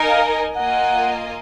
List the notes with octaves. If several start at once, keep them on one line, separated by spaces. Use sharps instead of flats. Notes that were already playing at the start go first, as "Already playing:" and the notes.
Already playing: D#4 A#4 D#5 G#5
F5
A#3 F4 A#4 D#5 F#5 G#5